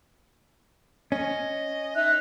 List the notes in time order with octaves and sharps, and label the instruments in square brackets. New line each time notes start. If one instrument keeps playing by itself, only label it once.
[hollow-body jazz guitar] C#4 [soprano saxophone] D#5
[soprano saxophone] D#4 [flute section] E5 F#6